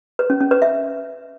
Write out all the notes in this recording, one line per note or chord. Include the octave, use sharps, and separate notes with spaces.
B4
C#4
C#4
B4
E5